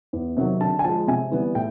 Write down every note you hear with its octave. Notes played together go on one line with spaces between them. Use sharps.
E2
C3 D#3 F#3
D3 A5
G#5
F3 G#3 A5
C3 G#5
E3 G3 B3
A2 G5